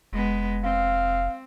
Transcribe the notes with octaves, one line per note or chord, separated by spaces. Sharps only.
F1 G#3 B3
C4 F5